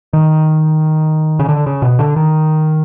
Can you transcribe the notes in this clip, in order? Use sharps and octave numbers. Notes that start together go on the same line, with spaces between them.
D#3
C#3
D3
C#3
B2
D3
D#3